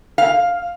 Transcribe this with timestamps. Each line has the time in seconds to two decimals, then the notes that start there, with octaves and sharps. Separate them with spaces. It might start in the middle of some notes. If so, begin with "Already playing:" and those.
0.18 F5